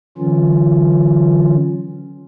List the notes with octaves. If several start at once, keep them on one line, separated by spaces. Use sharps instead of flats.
D3 E3 F#3 C#4 F4